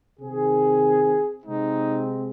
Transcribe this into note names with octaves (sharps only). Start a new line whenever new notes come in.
C3 D#3 C4 G#4
C3 G#3 C4 D#4